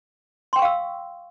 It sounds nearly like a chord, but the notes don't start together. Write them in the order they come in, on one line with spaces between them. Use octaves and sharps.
C6 G5 C#6 F5 E6